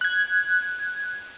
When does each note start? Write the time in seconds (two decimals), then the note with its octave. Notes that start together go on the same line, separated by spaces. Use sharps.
0.01 F#6 G#6